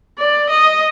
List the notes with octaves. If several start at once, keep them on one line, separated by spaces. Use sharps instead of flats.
D5
D#5